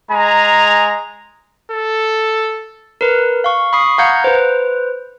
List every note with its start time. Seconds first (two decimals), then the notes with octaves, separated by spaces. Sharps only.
0.10 G#3 G#5 A#5
1.72 A4
3.01 A#4 B4
3.44 F5 C#6
3.73 B5 C#6 D#6 C7
3.98 F5 F#5 A#5 G6 G#6 C#7
4.24 B4 C5